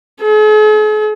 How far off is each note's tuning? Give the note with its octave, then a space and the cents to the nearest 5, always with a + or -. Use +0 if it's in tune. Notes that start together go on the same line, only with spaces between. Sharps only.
G#4 +45